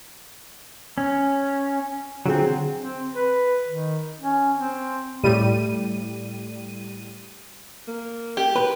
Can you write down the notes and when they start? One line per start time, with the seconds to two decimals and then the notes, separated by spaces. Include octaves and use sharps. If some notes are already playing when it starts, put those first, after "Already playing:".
0.98 C#4
2.26 D3 F#3 C4 F4 G#4
2.80 C4
3.14 B4
3.68 D#3
4.20 C#4
4.57 C4
5.24 A2 G3 D#7
7.88 A#3
8.37 G4
8.56 B4